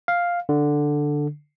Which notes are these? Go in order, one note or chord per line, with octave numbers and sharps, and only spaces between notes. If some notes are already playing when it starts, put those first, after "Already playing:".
F5
D3